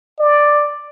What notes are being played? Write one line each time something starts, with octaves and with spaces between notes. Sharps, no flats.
D5